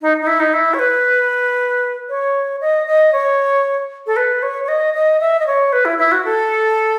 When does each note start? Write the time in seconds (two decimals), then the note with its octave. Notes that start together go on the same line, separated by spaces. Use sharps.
0.02 D#4
0.22 D#4
0.27 E4
0.40 D#4
0.53 E4
0.74 C#5
0.79 B4
2.09 C#5
2.61 D#5
2.87 D#5
3.13 C#5
4.07 A4
4.16 B4
4.43 C#5
4.64 C#5
4.68 D#5
4.94 D#5
5.20 E5
5.40 D#5
5.47 C#5
5.72 B4
5.85 E4
5.98 E4
6.12 F#4
6.25 A4